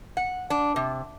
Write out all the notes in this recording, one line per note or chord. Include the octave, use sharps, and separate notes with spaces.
F#5
D4
C3